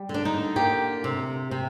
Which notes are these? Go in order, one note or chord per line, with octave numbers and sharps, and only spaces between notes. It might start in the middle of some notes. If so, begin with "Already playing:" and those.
Already playing: G3
D3
D4
D#4
A#3 G4
C3
C3